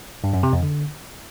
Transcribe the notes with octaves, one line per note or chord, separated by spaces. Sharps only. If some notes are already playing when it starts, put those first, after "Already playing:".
G2
F#2
C3
F2
D3